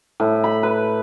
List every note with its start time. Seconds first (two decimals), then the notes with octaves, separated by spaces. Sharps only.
0.20 A2
0.44 B5
0.63 B4